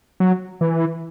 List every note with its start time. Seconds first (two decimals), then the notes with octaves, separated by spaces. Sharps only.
0.20 F#3
0.61 E3